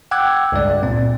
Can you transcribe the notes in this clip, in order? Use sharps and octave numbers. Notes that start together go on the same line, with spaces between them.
F#5 G5 D6 E6 F#6 G#6
C#2 G2 D5
A#2 C4